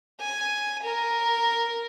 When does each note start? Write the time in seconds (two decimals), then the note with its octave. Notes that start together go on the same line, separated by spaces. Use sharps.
0.20 G#5
0.83 A#4